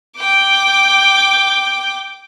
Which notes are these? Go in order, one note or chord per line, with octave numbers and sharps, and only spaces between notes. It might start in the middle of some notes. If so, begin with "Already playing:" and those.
G5 D6